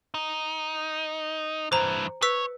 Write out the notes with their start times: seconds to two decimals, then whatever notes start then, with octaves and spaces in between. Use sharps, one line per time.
0.14 D#4
1.72 G2 E3 C5 A#5
2.22 B4 C#5 E6 B6